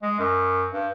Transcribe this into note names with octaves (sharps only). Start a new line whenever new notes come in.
G#3
F#2
G2